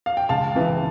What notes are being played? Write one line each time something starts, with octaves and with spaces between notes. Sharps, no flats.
F5
G5
C#2 F5 A5
C#3 E3